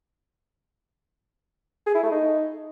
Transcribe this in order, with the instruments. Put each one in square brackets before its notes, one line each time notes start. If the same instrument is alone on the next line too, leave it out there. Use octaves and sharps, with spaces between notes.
[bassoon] G#4
E4
A3
D#4